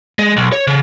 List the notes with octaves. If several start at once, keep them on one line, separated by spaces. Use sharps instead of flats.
G#3
B1
C#5
C#3